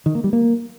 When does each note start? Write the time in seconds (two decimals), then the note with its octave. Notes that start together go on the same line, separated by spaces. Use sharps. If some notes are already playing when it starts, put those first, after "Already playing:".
0.06 D#3
0.15 A#3
0.24 G3
0.33 A#3